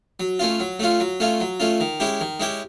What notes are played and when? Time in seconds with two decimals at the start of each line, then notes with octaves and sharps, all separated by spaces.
0.20 F#3
0.39 A3 C#4 F4
0.60 F#3
0.79 A3 C#4 F4
1.00 F#3
1.20 A3 C#4 F4
1.41 F#3
1.60 A3 C#4 F4
1.80 D#3
2.00 G#3 C#4 E4 G4
2.21 D#3
2.40 G#3 C#4 E4 G4